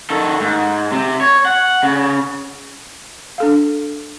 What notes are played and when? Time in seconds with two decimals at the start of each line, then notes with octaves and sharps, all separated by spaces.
0.10 D#3 A4
0.40 G#2
0.92 C3
1.21 C#5
1.45 F#5
1.83 C#3
3.38 D4 A4 F5